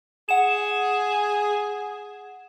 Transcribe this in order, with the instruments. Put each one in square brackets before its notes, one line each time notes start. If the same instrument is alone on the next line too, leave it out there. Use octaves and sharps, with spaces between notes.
[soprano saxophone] G#4 [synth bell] F#5 E7